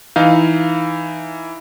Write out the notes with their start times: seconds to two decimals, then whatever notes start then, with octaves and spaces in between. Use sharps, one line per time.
0.16 E3 D#4 F5